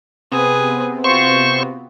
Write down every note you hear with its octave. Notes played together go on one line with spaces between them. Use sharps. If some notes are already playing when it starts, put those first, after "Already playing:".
C3 B3 C4 G#4 B4
F4 F#4 C5 C#6